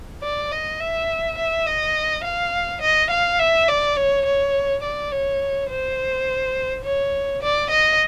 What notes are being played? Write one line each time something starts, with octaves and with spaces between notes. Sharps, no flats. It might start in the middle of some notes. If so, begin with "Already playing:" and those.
D5
D#5
E5
E5
D#5
F5
D#5
F5
E5
D5
C#5
C#5
D5
C#5
C5
C#5
D5
D#5